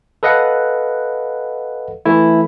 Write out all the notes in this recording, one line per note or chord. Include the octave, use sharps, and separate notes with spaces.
A4 B4 D#5 F5 F#5
E3 A3 E4